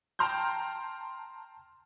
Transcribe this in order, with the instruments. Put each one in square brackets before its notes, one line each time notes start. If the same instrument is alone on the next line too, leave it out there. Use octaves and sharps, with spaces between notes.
[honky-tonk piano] G5 A5 A#5 C6 F6 G6